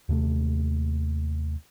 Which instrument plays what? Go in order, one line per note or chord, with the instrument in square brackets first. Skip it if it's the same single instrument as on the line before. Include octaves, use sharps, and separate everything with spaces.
[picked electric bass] D#2 C3 A3